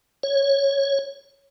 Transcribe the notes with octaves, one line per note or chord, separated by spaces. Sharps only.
C#5